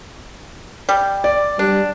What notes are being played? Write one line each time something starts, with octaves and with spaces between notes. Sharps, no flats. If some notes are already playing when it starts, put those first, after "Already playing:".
G3
D5
G3 D4